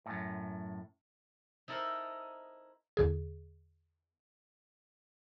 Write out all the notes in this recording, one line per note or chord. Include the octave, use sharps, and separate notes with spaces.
F#2 A2
D#4 E4 A4 A#4 C5 D#5
E2 D3 G#4